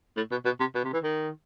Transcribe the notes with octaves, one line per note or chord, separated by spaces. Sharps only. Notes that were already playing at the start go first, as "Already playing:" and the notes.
A2
B2
B2
C3
B2
C3
E3
D#3